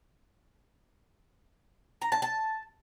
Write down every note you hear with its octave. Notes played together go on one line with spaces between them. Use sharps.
A#5
A5
A5